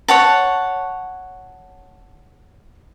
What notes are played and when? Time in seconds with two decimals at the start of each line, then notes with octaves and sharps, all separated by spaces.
0.08 C#5 F#5 A5